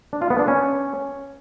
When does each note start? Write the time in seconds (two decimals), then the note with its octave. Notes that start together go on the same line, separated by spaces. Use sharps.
0.13 D4
0.22 F4
0.30 B3
0.39 D4
0.48 C#4